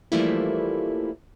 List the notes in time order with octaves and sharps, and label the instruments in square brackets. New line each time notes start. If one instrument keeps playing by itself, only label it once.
[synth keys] E3 F3 G3 A3 A#3 E4